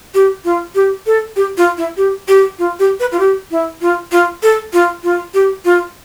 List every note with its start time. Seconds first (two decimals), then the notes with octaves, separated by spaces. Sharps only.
0.14 G4
0.45 F4
0.75 G4
1.06 A4
1.36 G4
1.57 F4
1.77 E4
1.97 G4
2.28 G4
2.59 F4
2.79 G4
3.00 B4
3.12 F4
3.19 G4
3.51 E4
3.81 F4
4.12 F4
4.43 A4
4.73 F4
5.03 F4
5.34 G4
5.65 F4